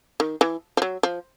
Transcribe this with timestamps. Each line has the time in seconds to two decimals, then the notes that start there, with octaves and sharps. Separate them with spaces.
0.20 D#3
0.41 E3
0.77 F3
0.82 F#3
1.03 F3